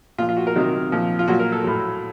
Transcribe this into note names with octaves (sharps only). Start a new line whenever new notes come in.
A#2 F3 F4
F4
F#4
A#4
C3 D#3 F#3
A#2 F3
F4
A#2 F#3 F#4
A#4
A4
A2 F#3